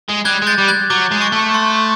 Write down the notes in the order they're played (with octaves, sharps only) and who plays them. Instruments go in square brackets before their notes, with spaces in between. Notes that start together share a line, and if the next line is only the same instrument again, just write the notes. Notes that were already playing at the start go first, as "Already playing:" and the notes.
[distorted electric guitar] G#3
[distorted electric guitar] G3 [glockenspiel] F#6 G#6
[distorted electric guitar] G#3
[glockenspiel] G6 A6
[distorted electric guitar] G3
[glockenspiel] F#6 G#6
[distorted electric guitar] F#3 [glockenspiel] D6
[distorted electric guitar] G#3
[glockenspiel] C#6
[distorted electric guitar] A3
[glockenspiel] C6